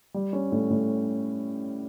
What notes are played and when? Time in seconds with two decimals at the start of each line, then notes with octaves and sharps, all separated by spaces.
0.14 G3
0.33 C#4
0.52 A2
0.70 A2